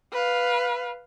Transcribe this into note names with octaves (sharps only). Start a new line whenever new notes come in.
B4 F5